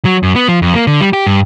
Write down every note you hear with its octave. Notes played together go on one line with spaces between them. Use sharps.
F#3
F#2
B3
F3
F2
A#3
D3
G3
G4
G2